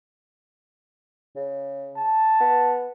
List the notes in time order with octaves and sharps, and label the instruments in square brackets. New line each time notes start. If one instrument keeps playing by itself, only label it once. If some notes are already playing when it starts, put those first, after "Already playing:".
[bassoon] C#3
[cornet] A5
[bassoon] B3